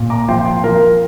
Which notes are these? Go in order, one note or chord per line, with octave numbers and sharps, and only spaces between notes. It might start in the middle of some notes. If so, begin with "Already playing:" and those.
Already playing: A#2
A#5 D6
F3 G5 C6
G5 C6
F3 F4 A#4